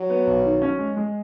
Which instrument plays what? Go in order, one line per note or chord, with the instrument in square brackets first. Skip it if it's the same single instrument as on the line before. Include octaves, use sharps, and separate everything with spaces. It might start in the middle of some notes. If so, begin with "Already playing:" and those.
Already playing: [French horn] F#3
[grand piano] B3
B1
D#3
C#4
G#3
G#3